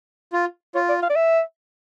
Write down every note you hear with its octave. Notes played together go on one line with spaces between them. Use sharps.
F4
F4 C#5
D5
F5
D5
E5